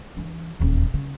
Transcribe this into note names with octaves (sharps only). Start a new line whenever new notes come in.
E3 D4
D#1 E2
C#3